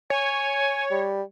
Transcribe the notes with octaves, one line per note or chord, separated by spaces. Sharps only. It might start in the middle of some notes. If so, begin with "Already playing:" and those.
C#5 G#5
G3